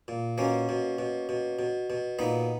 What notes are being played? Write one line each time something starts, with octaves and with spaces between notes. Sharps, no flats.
A#2
B2 A#3 C#4
B2
B2
B2
B2
B2
A#2 B3 D#4